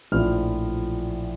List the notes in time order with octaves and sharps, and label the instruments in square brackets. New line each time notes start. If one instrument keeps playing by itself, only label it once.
[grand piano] A#1 A2 F3 F6